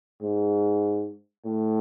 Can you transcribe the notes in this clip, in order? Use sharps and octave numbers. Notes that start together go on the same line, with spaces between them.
G#2
A2